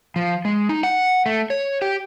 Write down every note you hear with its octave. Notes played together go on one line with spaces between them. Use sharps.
F3
G#3
D#4
F#5
A3
C#5
G4